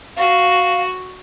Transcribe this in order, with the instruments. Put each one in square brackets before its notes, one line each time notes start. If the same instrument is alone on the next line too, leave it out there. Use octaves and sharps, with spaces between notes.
[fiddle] F#4 [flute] F5